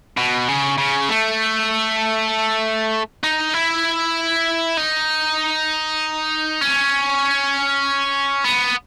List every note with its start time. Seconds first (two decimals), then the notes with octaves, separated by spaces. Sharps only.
0.18 B2
0.48 C#3
0.78 C#3
1.09 A3
3.23 D#4
3.54 E4
4.77 D#4
6.61 C#4
8.45 B3